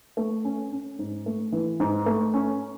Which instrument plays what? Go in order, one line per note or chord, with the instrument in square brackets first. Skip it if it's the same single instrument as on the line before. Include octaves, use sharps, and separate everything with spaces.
[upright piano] A3
C#4
C#4
G#2
A3
E3
G#2
A3
C#4